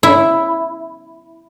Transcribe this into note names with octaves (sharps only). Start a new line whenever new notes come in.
E4